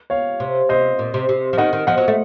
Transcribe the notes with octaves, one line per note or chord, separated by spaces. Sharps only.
C#5 F5
C3
C3 C5 D#5
A#2
C3
C3
F3
D#3 D#5 F#5
D#3
F3 D#5 F#5
F#3
A3